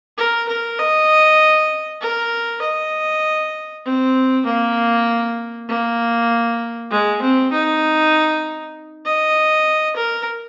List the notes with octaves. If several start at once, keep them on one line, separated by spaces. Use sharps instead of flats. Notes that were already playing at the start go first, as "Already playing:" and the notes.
A#4
A#4
D#5
A#4
D#5
C4
A#3
A#3
G#3
C4
D#4
D#5
A#4